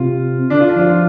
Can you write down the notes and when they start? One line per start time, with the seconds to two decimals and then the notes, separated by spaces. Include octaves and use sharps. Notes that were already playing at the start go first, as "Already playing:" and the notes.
Already playing: C3 F4
0.50 D3 D4
0.60 F4
0.70 D4
0.75 F3 F4
0.90 F4